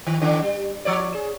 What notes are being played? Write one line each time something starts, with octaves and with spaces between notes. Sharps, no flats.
D#3
D3 D#3 D4
G3
F3 C#5 D5
G#4